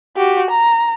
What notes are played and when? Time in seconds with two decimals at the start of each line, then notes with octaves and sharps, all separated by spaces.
0.17 F#4 G4
0.51 A#5